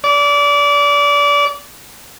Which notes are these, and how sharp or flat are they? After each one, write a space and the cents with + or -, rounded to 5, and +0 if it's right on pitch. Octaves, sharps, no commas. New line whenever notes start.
D5 -25